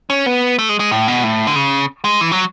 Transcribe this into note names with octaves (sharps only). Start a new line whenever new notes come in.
C#4
B3
A3
G#3
G#3
A2
B2
A2
D3
C#3
G#3
E3
F#3